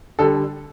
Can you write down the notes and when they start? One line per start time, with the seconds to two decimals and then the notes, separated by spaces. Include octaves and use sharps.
0.19 D3 G3 A4